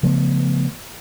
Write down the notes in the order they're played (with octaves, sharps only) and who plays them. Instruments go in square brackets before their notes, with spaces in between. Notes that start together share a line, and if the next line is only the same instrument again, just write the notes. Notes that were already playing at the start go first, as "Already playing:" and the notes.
[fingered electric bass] C#3 F3 A3 B3